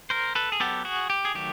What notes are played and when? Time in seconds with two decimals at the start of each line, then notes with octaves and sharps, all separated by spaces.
0.10 A#4 C5
0.35 A4 B4
0.52 G#4
0.60 F#3 B3 G4 A4
0.85 F#4 G#4
1.10 G4
1.25 G#4
1.35 D#3 F#3 A3 G4